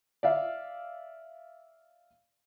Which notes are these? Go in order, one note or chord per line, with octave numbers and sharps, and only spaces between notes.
D5 E5 F5